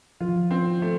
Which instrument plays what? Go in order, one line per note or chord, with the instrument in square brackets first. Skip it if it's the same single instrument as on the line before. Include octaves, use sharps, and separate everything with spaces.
[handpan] F3 [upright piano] F4
[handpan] D#3
F3
[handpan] D#3 [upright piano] C4
[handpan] D#3 [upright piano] A3